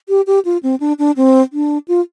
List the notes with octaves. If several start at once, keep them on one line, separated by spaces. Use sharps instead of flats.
G4
G4
F4
C4
D4
D4
C4
D4
F4